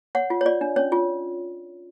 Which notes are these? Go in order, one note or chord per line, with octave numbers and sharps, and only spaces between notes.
C#5 F#5
F4
C#5
F4 D5
D4
C#4 C#5
F4